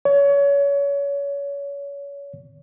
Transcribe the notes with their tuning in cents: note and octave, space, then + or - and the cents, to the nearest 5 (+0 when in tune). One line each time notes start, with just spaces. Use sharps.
C#5 +30